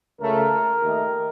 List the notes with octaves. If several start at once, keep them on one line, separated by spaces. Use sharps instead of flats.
C#2 C#3 A3 A#4
D#2 D#3 A3